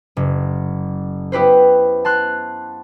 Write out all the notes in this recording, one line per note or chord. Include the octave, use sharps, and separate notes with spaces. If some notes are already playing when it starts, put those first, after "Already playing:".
F#1
B3 E4 G4 B4 C5
A5 C6 F#6